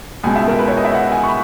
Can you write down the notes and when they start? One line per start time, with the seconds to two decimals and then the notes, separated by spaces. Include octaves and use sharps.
0.24 C#2 B2 G#3 G#5
0.36 E5
0.48 A#4
0.59 B4
0.68 C#5
0.77 D#5
0.85 E5
0.94 F#5
1.12 G#5
1.23 C#6
1.29 B5